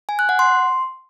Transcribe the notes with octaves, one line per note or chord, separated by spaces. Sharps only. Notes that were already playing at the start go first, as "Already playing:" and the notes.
G#5
F#6
F#5
C6